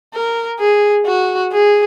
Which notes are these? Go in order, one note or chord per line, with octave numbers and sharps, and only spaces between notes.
A#4
G#4
F#4
G#4